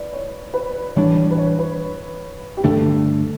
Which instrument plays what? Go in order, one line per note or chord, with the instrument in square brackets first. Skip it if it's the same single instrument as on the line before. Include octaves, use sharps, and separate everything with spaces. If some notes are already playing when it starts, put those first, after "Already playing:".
Already playing: [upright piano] B4 D5
C#5
B4
[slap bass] A2 E3 G3 D4 [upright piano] C#5
[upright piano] C#5
B4
C#5
B4
G4
[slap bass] G2 D3 A3 D4 [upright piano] A4